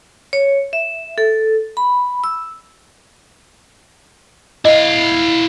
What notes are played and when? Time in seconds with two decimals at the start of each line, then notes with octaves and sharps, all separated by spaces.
0.33 C#5
0.73 E5
1.18 A4
1.77 B5
2.24 E6
4.65 E4 D#5 F5